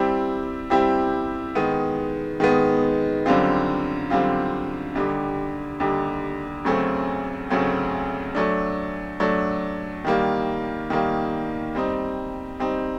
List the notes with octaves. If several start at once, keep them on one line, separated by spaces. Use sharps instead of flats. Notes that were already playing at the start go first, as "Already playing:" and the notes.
Already playing: G3 C4 E4 G4
G3 C4 E4 G4
D#3 G#3 B3
D#3 G#3 B3
F#2 D3 G3 C4 F4
F#2 D3 G3 C4 F4
D#2 D3 G3
D#2 D3 G3
D2 C#3 F#3 A3 C4
D2 C#3 F#3 A3 C4
F#3 A3 D4
F#3 A3 D4
D#3 G3 A#3
D#3 G3 A#3
G3 C4 D#4
G3 C4 D#4